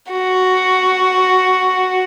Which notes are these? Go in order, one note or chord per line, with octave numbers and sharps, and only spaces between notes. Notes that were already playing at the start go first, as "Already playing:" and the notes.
F#4